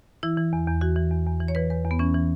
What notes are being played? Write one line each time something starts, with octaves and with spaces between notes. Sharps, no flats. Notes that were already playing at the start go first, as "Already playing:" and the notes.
E3 E4
E3
E2
E2
E3 F#4
E3
E2
E2
E3
C#5
E3 B4
E2 B4
E2
B3
E3 C#4
E3